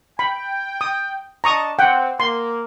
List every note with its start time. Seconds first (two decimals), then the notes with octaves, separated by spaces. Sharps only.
0.19 G5 B5
0.81 D#6
1.44 D4 D#5 A5 A#5 C#6 D#6
1.79 C4 F#5 G5
2.20 A#3 C6